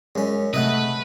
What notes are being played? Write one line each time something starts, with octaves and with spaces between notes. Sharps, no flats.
F#2 G#3 C#4
C3 A3 B4 D#5 E5 F#5